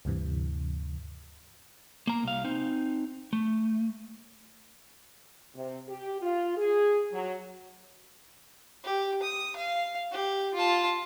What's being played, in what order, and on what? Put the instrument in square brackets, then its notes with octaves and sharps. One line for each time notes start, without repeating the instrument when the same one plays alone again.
[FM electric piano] D2 G2 C3 E3
[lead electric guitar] A#3 A#5
C2 F5
C4 D#4
A3
[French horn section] C3
G4
F4
G#4
F#3
[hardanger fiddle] G4
D#6
F5
G4
F4 A5